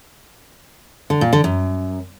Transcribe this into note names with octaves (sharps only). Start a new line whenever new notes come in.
D3
A#2
D3
F#2